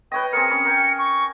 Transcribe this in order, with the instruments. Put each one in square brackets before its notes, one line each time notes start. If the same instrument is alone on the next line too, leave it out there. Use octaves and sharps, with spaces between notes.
[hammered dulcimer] B4 C#5 D#5 [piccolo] G5
[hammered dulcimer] C4 G#4 A#4 [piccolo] C#7
[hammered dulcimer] C#4 B5
A#4 G5 G#5
[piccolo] C#6